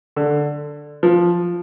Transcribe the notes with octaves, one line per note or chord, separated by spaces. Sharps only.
D3
F3